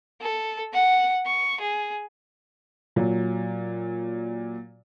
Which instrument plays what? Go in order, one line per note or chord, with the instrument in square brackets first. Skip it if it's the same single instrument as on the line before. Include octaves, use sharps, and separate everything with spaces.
[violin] A4
F#5
C#6
G#4
[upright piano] A#2 F#3